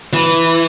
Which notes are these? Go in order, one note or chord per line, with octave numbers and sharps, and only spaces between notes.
E3